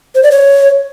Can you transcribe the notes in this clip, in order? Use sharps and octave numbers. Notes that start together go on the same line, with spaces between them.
C5
D5
C#5